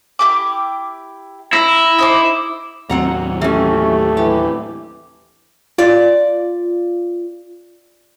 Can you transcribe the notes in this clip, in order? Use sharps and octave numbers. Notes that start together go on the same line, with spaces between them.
E4 G4 D6
E4 A#5
D#4 C5 D6
D#2 A2 F#3 C4 F#5 A#5
E3 A3 C#4 G4
E3 G4
F4 D5